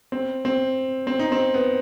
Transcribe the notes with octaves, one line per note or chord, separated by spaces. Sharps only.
C4
C4
C4
D#4
C4
B3